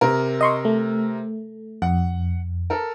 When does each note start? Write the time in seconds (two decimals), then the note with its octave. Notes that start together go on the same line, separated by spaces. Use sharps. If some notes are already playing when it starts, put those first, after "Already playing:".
0.01 C3 A#4
0.41 D#5 C6 C#6
0.65 A3
1.82 F2 F#5
2.70 A4 A#4